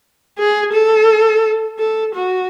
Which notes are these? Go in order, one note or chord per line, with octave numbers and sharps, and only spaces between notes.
G#4
A4
A4
F#4